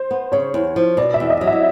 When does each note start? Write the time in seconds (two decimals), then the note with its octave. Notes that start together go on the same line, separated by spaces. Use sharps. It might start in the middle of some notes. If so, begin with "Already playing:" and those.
Already playing: C5
0.11 B3
0.32 C#3 C#5
0.54 E2
0.76 F3
0.97 B2 D5
1.14 E5
1.20 E2
1.30 D#5
1.41 F#3
1.47 E5